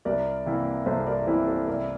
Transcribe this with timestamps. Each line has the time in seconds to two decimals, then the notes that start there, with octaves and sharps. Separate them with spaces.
0.05 C2 A#4 D5
0.46 C3 E3 A#3 E4
0.86 C2 A4 C5
1.06 A#4 D5
1.27 C3 E3 A#3 E4 A4 C5
1.47 A4 C5
1.67 C2 A#4 D5